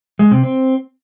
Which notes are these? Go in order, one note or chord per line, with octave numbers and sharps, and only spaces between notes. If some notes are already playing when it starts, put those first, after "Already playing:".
G#3
C3
C4